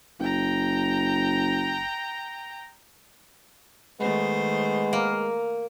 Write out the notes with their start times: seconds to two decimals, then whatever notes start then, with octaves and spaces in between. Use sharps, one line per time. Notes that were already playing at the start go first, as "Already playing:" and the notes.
0.20 F#1 G5 A#5
4.00 D#3 G#3 A3 B3 C5
4.93 A#3